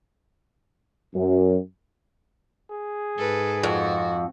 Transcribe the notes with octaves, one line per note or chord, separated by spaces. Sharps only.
F#2
G#4
G#2 A4 B4
F2 F#4